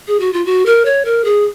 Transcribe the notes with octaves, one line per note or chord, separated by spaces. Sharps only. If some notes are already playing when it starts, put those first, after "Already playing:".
G#4
F#4
F4
F#4
A#4
C#5
A#4
G#4